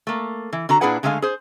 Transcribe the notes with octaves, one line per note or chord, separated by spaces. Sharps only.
A3 A#3
E3
D3 F#4 A#5
A#2 D4 E4 G#4 B4 F#5
D3 G#3 A3 F#4 F5 G#5
G#4 C5